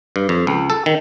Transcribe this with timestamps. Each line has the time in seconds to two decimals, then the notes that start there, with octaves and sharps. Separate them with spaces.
0.16 G2
0.29 F2
0.47 C#2
0.70 A4
0.86 D#3